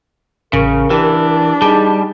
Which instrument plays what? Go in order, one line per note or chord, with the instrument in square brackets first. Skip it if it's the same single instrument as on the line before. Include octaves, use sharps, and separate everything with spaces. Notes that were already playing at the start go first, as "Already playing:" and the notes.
[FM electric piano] A1 C#6 [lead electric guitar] C#3 [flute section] A#4
[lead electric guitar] E3 [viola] D4 [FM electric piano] G4
[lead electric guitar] G3 [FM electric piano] D#4 G#4 [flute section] A5